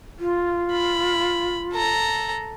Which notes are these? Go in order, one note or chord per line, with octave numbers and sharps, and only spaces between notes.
F4
B5
A4 A#5